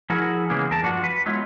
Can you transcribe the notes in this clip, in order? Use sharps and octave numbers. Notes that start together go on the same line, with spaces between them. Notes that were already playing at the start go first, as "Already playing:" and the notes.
F3 E4 F#4 G#4 A#4
C#3 E3 G#3 A#3 B3
E2 A#4 A5
G2 F3 D4 F#4
B4
F#3 G#3 B3 E4 F4